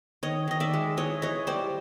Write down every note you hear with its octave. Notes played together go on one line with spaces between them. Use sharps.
D#3 C#5 D#5
D#3 D#5
D5 E5
G#3
E3 C#5 D#5
E3 C#5 D#5
G3 C5 D5